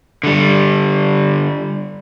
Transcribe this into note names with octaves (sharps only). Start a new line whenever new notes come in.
D3 G3